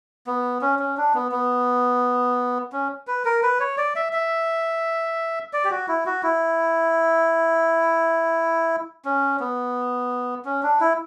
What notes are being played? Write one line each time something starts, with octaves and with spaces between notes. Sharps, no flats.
B3
C#4
C#4
D4
B3
B3
C#4
B4
A#4
B4
C#5
D5
E5
E5
D5
G4
F#4
E4
F#4
E4
C#4
B3
C#4
D4
E4